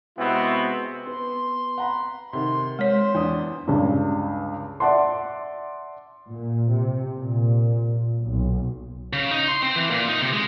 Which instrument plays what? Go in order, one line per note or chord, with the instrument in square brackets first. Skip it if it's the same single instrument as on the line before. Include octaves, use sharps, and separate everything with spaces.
[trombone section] C3 G#3 B3 C4 E4 F#4
[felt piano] B3 [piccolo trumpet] C6
[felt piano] F#5 A#5 B5
[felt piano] C3 D#3 [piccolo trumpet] C6
[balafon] G#3 C#5 [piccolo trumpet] C5
[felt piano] E2 D4 D#6
[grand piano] C#2 G2
D5 E5 F#5 A5 C6
[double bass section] A#2
C3
A#2
B1
[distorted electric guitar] C#3
D#4
C6
C4
E3
A#2
D#4
C3
G#3